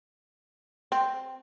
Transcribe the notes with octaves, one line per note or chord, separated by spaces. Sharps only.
C4